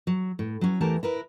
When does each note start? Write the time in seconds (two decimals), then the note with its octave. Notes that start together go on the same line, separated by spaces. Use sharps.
0.07 F#3
0.39 A2
0.61 F#3 C#4
0.81 E2 E3 A3 G4 A#4 A5
1.03 E4 A#4 B4